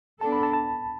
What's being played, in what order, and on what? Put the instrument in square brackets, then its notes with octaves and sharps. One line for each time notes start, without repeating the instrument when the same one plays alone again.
[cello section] B3 D4 A4 [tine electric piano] A5
[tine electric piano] B5
A5
A5